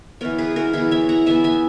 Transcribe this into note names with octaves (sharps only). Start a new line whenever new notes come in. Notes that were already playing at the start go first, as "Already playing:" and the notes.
E3 B3 A#4 C#5
G#4 B4
F#4 A#4
E3 B3 E4 G#4
C#5 E5
F#5 A#5
E3 B3 E5 G#5
E5 G#5